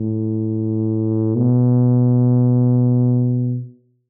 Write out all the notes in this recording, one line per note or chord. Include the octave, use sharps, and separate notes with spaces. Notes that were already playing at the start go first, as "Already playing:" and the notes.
Already playing: A2
B2